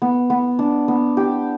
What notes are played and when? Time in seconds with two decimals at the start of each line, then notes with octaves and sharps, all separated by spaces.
0.02 B3
0.30 B3
0.59 D4
0.88 B3
1.17 G4